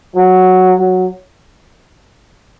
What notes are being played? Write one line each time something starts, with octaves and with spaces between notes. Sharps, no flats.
F#3
F#3